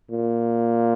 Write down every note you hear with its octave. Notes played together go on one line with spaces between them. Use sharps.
A#2